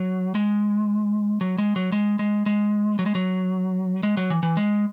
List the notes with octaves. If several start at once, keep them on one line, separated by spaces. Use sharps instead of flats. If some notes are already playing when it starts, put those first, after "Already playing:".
Already playing: F#3
G#3
F#3
G#3
F#3
G#3
G#3
G#3
F#3
G#3
F#3
G#3
F#3
E3
E3
G#3